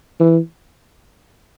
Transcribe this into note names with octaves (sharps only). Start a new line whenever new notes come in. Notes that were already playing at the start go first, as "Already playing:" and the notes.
E3